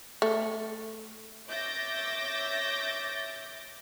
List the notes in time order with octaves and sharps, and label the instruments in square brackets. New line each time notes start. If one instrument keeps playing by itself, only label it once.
[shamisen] A3
[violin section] C#5 E5 D6 G6 A6 A#6